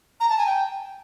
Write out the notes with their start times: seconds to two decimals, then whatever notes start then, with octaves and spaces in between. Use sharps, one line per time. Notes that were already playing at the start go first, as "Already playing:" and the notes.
0.20 A#5
0.29 A5
0.38 G#5
0.46 G5